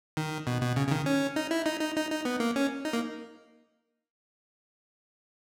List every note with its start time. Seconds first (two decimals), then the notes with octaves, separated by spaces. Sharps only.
0.17 D#3
0.47 B2
0.62 B2
0.76 C#3
0.87 C#3
0.91 D#3
1.06 C#4
1.36 D#4
1.51 E4
1.66 D#4
1.80 D#4
1.96 D#4
2.11 D#4
2.25 B3
2.40 A#3
2.56 C#4
2.85 D#4
2.93 A#3